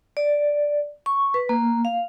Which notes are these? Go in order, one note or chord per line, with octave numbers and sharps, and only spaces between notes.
D5
C#6
B4
A#3
F5